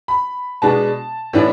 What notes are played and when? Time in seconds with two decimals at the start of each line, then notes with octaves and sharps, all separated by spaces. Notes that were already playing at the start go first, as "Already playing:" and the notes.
0.08 B5
0.62 B2 G#3 B3 D4 A5
1.33 A2 E3 B3 D4